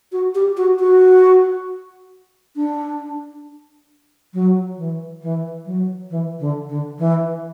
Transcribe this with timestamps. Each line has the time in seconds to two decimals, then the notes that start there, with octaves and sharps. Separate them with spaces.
0.12 F#4
0.35 G4
0.57 F#4
0.79 F#4
2.56 D4
4.34 F#3
4.77 E3
5.22 E3
5.66 F#3
6.10 E3
6.40 D3
6.69 D3
6.99 E3